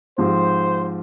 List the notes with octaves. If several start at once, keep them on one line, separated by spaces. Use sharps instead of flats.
G#2 F3 C4 G4 C5